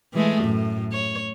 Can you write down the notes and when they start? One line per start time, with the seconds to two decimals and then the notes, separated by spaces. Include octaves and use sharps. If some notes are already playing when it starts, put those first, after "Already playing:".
0.13 E3 G#3 A3
0.43 F#2 A2
0.92 C#5